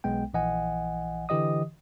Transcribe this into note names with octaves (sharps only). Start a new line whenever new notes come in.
B1 G#3 B3 G5
A#1 E3 D#5 F#5 G#5
D3 E3 G4 D#5 D#6